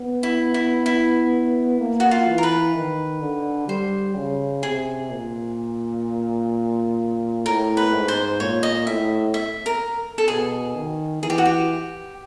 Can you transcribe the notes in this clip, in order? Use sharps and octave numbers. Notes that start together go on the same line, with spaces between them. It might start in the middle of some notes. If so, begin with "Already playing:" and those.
Already playing: B3
E4
E4
E4
A#3
F#4
F4
E3
A#4
B4
D#3
D3
G3 C5
C#3
C3 G#4
A#2
A2 A#4
B4
G#2
C5
A#2 C#5
D#5
A2 E5
E5
A#4
A4
B2 G#4
D#3
E3 G#4
G4
F#4
G4